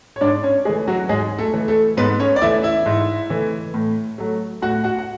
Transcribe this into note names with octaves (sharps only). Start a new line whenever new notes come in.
C#5
G#2 D4 D5
C#4 C#5
E3 G#3 A3 G#4
F#3 F#4
G#2 G#3 G#4
A3 A4
E3 A3
A3 A4
G#2 B3 B4
C#4 C#5
D5
E3 A3 E4 E5
E4 E5
G#2
E3 A3
A2
F#3 A3
A2 F#4 F#5
F#4 F#5
F#5